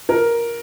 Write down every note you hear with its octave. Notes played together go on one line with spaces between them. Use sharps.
A#4